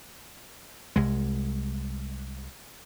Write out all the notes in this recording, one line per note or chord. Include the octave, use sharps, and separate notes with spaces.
C2 G#3